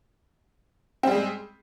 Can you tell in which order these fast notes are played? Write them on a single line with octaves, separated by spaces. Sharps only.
C4 G3 G#4 G#3